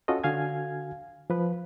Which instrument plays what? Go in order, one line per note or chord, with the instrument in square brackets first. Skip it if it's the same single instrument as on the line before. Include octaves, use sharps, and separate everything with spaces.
[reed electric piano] C#4 F4 F#4 A4 D#5
D3 F#4 F5 G#5 G#6
F3 B4